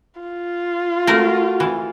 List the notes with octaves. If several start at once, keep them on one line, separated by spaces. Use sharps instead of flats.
F4
A3 F#4 A#4 A5
E3